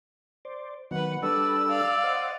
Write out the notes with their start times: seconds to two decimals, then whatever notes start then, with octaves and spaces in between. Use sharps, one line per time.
0.45 C5 D5
0.91 D#3 F#3 B3 B4 F#5
1.23 G3 D4 A4 B4 D5 E6
1.68 D5 F5
2.04 C5 D#5 F#5